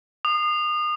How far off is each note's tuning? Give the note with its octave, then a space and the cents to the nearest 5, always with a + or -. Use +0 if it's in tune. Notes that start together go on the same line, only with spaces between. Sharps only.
D#6 -35